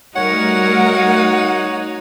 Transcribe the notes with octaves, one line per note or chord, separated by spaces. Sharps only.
G3 A3 D#4 F#4 A#4 C#5 F#5